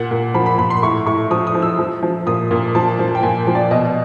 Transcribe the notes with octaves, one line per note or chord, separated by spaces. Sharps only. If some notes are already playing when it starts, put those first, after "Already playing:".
Already playing: A#2 F#5
A#2
F3 B5
B5
A#2 B5
C6
A2 C#6
A2 C#6
F3 D#6
D#6
F3
E6
F3
F3
A#2 D#6
A#2
F3 A5
F3
G5
A#2 G#5
F3
D5
B2 D#5